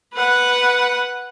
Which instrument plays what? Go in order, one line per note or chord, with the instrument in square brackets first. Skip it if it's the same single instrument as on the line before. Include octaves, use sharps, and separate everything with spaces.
[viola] B4 F#5